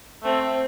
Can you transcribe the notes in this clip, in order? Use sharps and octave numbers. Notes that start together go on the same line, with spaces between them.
A3 C4
A3